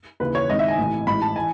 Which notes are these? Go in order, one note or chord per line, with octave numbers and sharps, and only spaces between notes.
D#2 C#3 E3 B4
C#5
G#1 G#2 D#3 D#5
E5
G#5
A1 A2 E3
A1 G#2 E3 B5
A5
E3 G#5